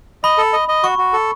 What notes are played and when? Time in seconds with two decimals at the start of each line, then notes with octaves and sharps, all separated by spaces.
0.24 D#5 B5
0.38 A4
0.53 D#5
0.68 D#5
0.84 F#4 C#6
0.98 F#4
1.13 A4